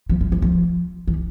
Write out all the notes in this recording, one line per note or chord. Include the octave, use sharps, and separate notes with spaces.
F3
F3
E3
F3
E3